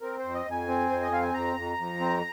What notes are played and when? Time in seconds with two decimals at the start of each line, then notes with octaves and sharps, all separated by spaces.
0.01 C4 A#4
0.19 C5
0.24 F2
0.34 D#5
0.46 F2
0.51 G#5
0.68 C4
0.90 F2 C5
1.02 D#5
1.11 C4 F5
1.23 G#5
1.34 F2 A#5
1.56 F2
1.78 F2
2.00 C4